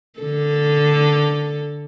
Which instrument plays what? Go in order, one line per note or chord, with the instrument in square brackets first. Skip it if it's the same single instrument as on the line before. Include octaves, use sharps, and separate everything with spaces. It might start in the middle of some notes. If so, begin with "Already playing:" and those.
[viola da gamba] D3 A4